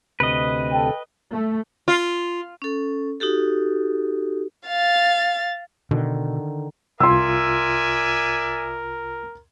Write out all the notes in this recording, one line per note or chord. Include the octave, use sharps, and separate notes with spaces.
D2 C3 B4 D#5
A4 G5
A3
F4
C#4 A4
D#4 F#4 G4 A4
F5 A6
B2 D3 D#3
C2 F4 A#4 D5 E5 G#5 C6 E6